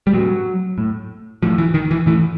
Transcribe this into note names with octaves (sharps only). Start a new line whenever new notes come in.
G3
A2 F#3
A2
A2 F3
E3
D#3
E3
A2 E3